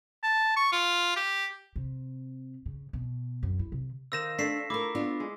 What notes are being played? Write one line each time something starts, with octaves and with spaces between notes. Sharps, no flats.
A5
C#6
F4
G4
C3
C#3
B2
F#2
E4
C3
D#3 C5 F5 E6 A#6 E7
A3 D4 A4 B6 C7 E7
A3 E4 F4 A#4 D6
B3 D4 F4
G#3